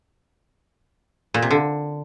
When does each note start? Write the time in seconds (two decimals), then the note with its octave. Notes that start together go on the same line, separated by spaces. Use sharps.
1.34 A#2
1.42 C3
1.51 D3